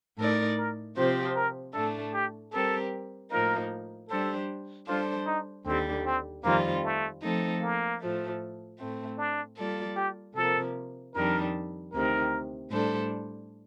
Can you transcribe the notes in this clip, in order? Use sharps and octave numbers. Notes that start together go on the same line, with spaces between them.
A2 A3 D#4 A4 A#4 D5
A#4
C3 F3 C4 G4 C5
A#4
A2 A3 D4 A4
G4
G3 C4 G4 A4 A#4
A2 F3 A#3 D#4 A#4
G3 D4 G4 A4 C5
G3 D4 F4 A4 C5
D#4
D#2 D3 G3 C4
C4
F2 D#3 G3 A#3 C4 F4
A3
F3 A3 C4 D#4 A4
A#3
A2 F3 A3
A2 A3 C4
D4
G3 A#3 F4 A4 D5
G4
C3 F3 A#3 A4
F2 D#3 G3 D4 A#4
D2 C3 D#3 A#4
A2 G3 D4 A4 C5